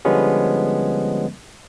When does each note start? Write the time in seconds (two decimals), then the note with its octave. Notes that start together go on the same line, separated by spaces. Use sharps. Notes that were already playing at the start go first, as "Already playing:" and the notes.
0.05 D3 F3 G3 G#3 B3 C#4